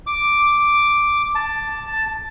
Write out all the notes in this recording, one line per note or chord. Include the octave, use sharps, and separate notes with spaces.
D6
A5